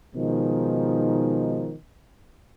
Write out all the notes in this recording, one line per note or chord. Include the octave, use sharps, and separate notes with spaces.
B2 D#3 F3 G#3 D#4